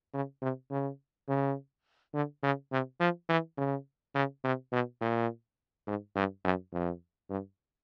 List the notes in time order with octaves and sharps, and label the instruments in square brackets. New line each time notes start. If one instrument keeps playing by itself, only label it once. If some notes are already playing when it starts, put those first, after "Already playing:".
[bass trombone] C#3
C3
C#3
C#3
D3
C#3
C3
F3
E3
C#3
C#3
C3
B2
A#2
G#2
G2
F#2
F2
G2